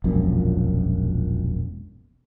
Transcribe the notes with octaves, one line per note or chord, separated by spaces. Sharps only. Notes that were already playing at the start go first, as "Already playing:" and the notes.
E1 A#1 F#2 A#2